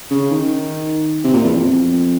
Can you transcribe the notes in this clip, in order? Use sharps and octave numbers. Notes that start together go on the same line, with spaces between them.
C#3
D#3
C3
A#2
E2
F2